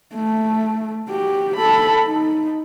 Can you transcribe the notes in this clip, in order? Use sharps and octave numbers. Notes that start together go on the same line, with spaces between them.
A3
F#4 G4
A4 B5
D#4